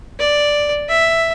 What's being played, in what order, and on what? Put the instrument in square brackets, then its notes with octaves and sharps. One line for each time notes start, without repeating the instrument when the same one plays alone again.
[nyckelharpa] D5
E5